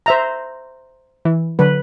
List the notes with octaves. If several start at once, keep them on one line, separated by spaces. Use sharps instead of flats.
C5 E5 A#5
E3
D3 F#3 B4